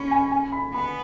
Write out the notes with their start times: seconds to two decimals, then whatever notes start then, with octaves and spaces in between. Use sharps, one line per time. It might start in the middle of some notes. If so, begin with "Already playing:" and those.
Already playing: C#4 B5 C#6
0.11 G#5
0.31 G#5
0.52 B5
0.73 B3 B5